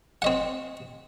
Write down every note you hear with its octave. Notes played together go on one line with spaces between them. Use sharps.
C4 D#5 F#5